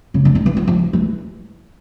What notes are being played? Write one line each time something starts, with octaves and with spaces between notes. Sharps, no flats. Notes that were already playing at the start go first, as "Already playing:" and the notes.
C#3
D3
D#3
E3
F3
F3
E3